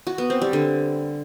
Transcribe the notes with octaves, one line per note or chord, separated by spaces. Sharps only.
F#4
B3
C4
G3
D3